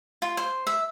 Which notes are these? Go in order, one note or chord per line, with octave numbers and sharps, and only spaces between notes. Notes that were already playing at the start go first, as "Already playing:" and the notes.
F4
C5
E5